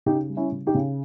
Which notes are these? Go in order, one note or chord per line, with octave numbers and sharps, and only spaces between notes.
C#3 D#4 G4
G3
C#4 E4
C#3
D#4 G4
C#3